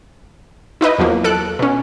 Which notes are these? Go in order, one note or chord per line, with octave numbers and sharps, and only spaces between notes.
D#4 E4 B4 D#5
E2 F3 F#3 A#3
A4 F#6 D7
B2 C#4